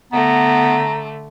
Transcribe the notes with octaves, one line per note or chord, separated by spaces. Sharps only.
D3 A3 B3 A#5